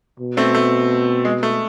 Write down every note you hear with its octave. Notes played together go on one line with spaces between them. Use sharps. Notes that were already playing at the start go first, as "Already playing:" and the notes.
B2
A3 C4
A3
G#3
A3